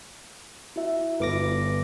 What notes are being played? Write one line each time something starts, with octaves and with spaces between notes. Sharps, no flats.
E4 F#4 E5
G1 B4 D6 A#6